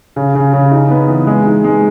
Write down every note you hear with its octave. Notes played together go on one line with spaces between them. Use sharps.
C#3
C#3
C#3
D#4
B3
E3
G#3
D#4
G#3